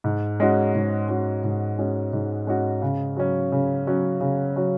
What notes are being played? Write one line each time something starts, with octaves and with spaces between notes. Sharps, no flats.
G#2
G#3 C#4 F#4
G#2
G#3 C#4 F#4
G#2
G#3 C#4 F#4
G#2
G#3 C#4 F#4
C#3
F#3 C#4
C#3
F#3 C#4
C#3
F#3 C#4